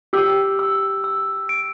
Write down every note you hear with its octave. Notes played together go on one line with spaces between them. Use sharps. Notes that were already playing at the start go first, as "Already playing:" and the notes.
G4 E6
E6
E6
D7